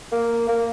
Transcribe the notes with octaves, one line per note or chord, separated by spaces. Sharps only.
A#3
A#3